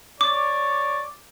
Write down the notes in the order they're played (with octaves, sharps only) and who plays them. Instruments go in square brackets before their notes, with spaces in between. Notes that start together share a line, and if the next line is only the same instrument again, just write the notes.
[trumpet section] C#5 D5 [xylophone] D6